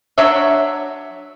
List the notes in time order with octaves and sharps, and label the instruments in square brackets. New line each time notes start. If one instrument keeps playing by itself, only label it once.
[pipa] F#3 D4 C#5 E5